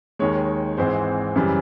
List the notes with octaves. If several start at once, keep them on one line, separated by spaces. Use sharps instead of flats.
D#2 D#3 G#3 C#5
G#1 G#2 E3 G#3 C4 C5
F#2 C#3 E3 G3